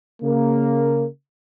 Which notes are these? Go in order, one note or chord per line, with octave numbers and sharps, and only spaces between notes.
C#3 A#3